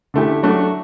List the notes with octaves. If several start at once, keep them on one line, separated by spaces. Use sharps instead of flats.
D3 A3 E4 G4
F#3 A3 D4 F#4